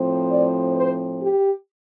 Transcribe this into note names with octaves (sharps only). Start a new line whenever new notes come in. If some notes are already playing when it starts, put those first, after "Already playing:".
Already playing: A2 F3 C4
D5
C5
G4